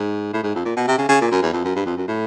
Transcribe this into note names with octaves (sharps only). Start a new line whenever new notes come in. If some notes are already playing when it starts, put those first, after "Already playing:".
Already playing: G#2
A2
G#2
F2
A#2
B2
C3
C#3
C#3
A#2
F#2
E2
F2
F#2
G2
F2
F#2
A2